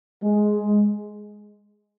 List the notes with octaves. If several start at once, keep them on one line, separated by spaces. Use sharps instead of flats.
G#3